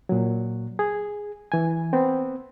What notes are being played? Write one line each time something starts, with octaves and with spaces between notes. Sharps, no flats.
A#2 F#3
G#4
E3 G#5
B3 C4